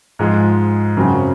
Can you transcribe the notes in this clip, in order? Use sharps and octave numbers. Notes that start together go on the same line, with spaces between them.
G#2 F3 G#3
F#2 C#3 F#3 C4 F#4